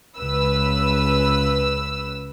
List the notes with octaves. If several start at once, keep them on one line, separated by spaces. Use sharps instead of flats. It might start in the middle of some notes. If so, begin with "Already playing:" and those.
C#2 B4 E6